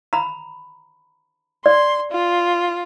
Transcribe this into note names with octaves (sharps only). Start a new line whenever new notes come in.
A#5 B5
D5 C6
F4